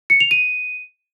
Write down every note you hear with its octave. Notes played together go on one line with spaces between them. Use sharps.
C#7
F7
D#7